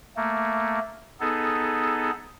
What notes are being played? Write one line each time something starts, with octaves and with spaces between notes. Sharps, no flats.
A3 A#3
B3 D#4 G#4 A4